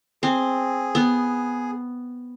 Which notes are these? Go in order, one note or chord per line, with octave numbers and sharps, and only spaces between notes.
C4 G#4
B3